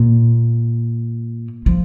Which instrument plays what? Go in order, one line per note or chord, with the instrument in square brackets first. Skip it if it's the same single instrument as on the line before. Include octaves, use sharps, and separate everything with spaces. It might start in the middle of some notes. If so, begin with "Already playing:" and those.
Already playing: [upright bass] A#2
F3